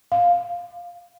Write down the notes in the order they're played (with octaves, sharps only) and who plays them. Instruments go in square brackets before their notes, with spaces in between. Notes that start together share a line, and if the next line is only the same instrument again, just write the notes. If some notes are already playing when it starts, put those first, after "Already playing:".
[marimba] F5